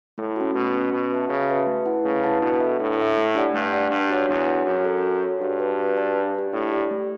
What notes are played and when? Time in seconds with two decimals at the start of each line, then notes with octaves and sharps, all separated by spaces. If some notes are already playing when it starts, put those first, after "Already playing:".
0.18 A2 A3
0.36 C#4 F#4
0.55 B2 A3
0.73 C#4
0.78 F#4
0.92 B2 C#4
1.10 F#4 B4 E5 A5
1.29 C#3 C#4
1.49 F#4 B4 E5 A5
1.66 A3
1.85 E4 B4 F#5 A5
2.04 C#3 A3
2.24 E4 B4 F#5 A5
2.41 B2 D4
2.61 A4 E5
2.79 A2 D4
2.97 A4 E5
3.17 A3
3.35 D4 G4 D5 F#5
3.54 G2 A3
3.72 D4 G4 D5 F#5
3.91 G2 D4
4.09 F#4 C#5 F#5
4.29 E2 D4
4.47 F#4 C#5 F#5
4.66 F#2 F#4
4.85 A4 C#5
5.03 F#4
5.22 A4 C#5
5.40 G2 F#4
5.60 B4 D5 A5
5.78 F#4
5.97 B4 D5 A5
6.16 D4
6.35 G4 D5
6.53 A2 D4
6.72 G4 D5
6.91 A3